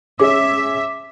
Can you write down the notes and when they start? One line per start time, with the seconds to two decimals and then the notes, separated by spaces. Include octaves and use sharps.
0.20 C#4 G#4 E5 D6